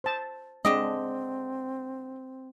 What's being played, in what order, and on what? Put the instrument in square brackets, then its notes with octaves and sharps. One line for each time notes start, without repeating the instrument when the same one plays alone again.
[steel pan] C5 A5
[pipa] D3 G4 D#5 [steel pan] G#3 D4 [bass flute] C4